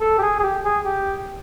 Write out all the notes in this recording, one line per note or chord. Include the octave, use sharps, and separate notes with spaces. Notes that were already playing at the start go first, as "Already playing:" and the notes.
A4
G4
G#4
G#4
G4
G#4
G4